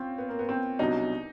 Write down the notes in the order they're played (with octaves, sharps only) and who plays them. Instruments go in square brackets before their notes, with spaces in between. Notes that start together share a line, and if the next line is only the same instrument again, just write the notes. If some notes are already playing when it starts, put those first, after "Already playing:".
Already playing: [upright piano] C4 C#4 F4
B3
A#3
B3
C4
[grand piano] C2 B2 F#3 B3 D4 [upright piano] D#4